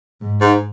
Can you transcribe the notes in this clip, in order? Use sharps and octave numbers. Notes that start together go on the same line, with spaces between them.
G#2
G#2